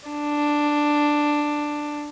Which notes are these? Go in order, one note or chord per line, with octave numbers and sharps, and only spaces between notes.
D4